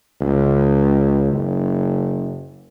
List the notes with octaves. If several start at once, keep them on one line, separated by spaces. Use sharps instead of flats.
C#2
F#1